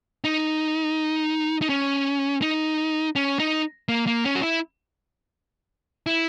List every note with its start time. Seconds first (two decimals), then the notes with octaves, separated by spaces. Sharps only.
0.24 D#4
1.62 D#4
1.69 C#4
2.42 D#4
3.16 C#4
3.39 D#4
3.89 A#3
4.07 A#3
4.25 C#4
4.35 F#4
4.42 E4
6.07 E4